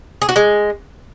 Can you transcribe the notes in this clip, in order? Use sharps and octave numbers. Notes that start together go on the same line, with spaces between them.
G#4
F#4
G#3